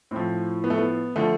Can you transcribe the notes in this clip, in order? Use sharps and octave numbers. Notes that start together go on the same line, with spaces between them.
A2 F3 C4
B3
A3
B3
D3 F3 A3